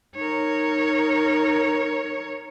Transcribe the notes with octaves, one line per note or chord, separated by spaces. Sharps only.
D#4 A#4 C#5